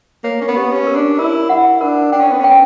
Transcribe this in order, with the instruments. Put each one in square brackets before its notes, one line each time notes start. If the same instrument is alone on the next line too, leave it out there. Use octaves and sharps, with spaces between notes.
[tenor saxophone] A#3 [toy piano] C#5
[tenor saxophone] C#4
B3
[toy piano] G4
[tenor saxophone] C#4
[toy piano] A#4
[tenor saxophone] D4
[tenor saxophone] E4 [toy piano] A#4
[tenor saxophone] E4 [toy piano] F#5
[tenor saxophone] D4 [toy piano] A#4
[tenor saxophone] D4 [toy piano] G5
[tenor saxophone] C#4
B3
[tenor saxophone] C#4 [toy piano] G5